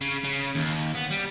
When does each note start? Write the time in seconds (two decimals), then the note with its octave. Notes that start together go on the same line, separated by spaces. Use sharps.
0.01 C#3
0.24 C#3
0.55 D#2
0.95 B3
1.11 G3